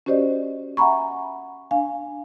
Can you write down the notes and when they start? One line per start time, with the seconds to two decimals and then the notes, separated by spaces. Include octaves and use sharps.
0.06 C#4 F#4 G4 C5 D5 D#5
0.77 E5 F#5 G#5 A#5 B5 C#6
1.71 D4 F5 G#5